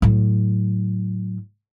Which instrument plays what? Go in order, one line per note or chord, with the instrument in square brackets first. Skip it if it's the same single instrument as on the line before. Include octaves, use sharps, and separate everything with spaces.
[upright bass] A2 F#3